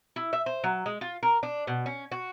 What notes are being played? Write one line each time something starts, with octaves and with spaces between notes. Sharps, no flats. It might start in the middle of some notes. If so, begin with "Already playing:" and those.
E4
E5
C5
F#3
G#3
F4
A#4
D4
B2
C#4
F#4